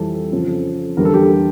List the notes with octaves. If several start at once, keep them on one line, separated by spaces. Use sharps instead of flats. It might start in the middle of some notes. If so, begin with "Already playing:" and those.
Already playing: F2 E3 G3 A4
F2 C#3 F3
E2 D3 G3 A#4
A4
G4
A4